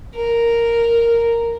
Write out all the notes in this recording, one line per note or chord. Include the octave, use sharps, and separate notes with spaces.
A#4